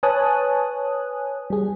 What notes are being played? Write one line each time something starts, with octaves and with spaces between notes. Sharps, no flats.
B4 C#5 G#5 A5 D#6 F#6
G3 G#4